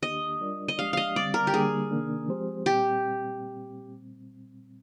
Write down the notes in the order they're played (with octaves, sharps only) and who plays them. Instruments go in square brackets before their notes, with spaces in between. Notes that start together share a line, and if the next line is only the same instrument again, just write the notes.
[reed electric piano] D#2 D#3 A#3 D4 G4 [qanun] D#5
[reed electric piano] G3 D4 F4 A#4 D5
[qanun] D#5
[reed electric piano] F3 G#3 D4 G4 D5 [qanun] F5
[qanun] D#5 F5
[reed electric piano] D3 G3 C4 [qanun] D5
[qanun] A#4
G4
[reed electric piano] D3 G3 A#3 D4 [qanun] G#4
[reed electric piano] C3 D#3 A#3 D4
F3 G#3 C4 G4 C5
[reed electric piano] A#2 G3 C4 [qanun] G4